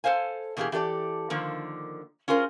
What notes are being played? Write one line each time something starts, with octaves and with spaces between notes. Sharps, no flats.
A4 A#4 C5 F5 G#5
B2 E3 A#3 C#4 G4 G#4
E3 G4 A4 D5
D3 D#3 F3 A#3
C#4 F4 G#4 A#4 C5